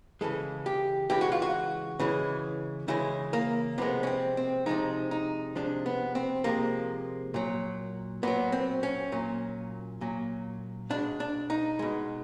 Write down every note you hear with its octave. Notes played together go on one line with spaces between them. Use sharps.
C#3 E3 G#3 A4
G4
C#3 E3 G#3 G4
F#4
F4
F#4
C#3 E3 G#3
C#3 E3 G#3 E4
A#3
C3 F3 G#3 B3
C#4
C4
C4
C3 F3 G#3 D#4
D#4
C3 F3 G#3 D4
B3
C4
C3 F3 G#3 A#3
A#2 F#3
A#2 F#3 B3
C4
C#4
A#2 F#3
A#2 F#3
B2 G#3 D4
D4
D#4
B2 G#3